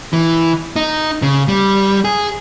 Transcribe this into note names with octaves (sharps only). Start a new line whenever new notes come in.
E3
D#4
C#3
G3
G#4